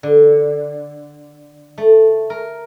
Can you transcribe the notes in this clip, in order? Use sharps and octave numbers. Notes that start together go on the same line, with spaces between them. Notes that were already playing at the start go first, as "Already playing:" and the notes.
D3
A3
A#4